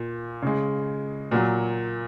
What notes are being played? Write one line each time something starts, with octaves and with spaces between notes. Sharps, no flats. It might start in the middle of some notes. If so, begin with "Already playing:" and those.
Already playing: A#2
C#3 G#3
A#2 F#3